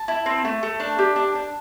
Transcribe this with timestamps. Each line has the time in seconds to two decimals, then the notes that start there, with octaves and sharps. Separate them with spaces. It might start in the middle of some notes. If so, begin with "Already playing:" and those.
Already playing: A5
0.08 E4
0.26 C4
0.45 A3
0.63 A3
0.80 D4
0.98 G4
1.16 D4
1.35 D4